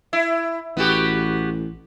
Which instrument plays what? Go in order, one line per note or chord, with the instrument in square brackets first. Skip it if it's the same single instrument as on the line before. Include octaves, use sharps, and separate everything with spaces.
[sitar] E4
[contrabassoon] A1 [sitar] B3 F#4 G4